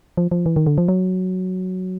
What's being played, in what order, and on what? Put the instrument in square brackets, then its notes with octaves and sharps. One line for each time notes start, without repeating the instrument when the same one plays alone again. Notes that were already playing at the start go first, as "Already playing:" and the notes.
[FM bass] F3
F3
E3
D#3
D3
F3
F#3